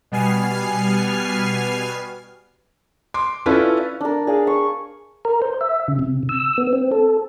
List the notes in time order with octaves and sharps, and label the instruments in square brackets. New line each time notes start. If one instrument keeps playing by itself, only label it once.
[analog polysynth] B2 G3 B3 G#5 F6 C7
[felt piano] C6 D6
C#4 E4 F4 A4 B4 D5
[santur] D4 A#4
G#4 D5 F5
C#6
[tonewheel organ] A#4
C5
E5
C#3
C3
E6
B3
C4
A4